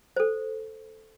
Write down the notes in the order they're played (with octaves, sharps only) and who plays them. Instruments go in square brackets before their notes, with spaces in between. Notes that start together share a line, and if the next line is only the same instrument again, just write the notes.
[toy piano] A4 C5